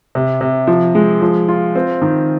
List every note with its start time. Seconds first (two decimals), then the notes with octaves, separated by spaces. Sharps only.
0.15 C3
0.41 C3
0.67 F3
0.95 G#3
1.22 F3
1.48 F4
1.75 C4
2.02 D#3